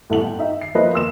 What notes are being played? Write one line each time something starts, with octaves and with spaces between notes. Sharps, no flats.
G1 A2 A3 A4 F#5 F#7
G5
D#4 E5
C7
F3 A#3 B4 C5 D#5 E5
A#3 C6 E6 E7